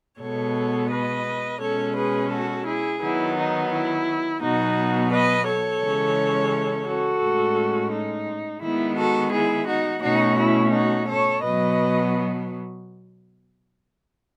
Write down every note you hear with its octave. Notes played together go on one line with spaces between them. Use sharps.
B2 G#3 B3 A4 C#5
B4 D#5
B2 G#3 C#4 A4 C#5
G#4 B4
F#4 A4
E4 G#4
D#3 F#3 B3 E4
D#4
E4
B2 F#3 B3 D#4 F#4
B4 D#5
A4 C#5
C#3 E3 G#3 C#4
F#4 A4
A2 G#3 C#4
D#4
D#3 G#3 B3 E4
F#4 A4
E4 G#4
D#4 F#4
B2 A3 C#4 D#4 F#4
E4
D#4 F#4
A4 C#5
B2 F#3 B3 B4 D#5